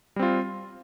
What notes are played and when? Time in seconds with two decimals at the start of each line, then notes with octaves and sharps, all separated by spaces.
0.16 G3
0.19 C4
0.23 F4